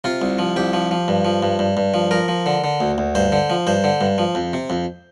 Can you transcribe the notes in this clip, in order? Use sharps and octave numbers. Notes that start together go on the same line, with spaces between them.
C3 F4
C2
F3
C2 G4
F3
F3
G2
F3
G2
G2
G2
F3
F3 A#4
F3
D3
D3
D2
D2
G2 C5
D3
F3
G2 C5
D3
G2
F3
F2
C3
F2